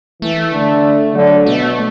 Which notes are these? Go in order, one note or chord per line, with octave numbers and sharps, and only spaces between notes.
E3 A3
D3
D3 F#3
B2 A3